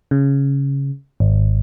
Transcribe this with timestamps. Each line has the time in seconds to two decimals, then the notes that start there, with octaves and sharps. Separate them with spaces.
0.11 C#3
1.20 G#1